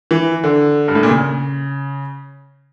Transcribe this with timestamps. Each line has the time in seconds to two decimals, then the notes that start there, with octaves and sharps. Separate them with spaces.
0.11 E3
0.44 D3
0.88 G2
0.95 A2
1.03 A#2
1.09 C#3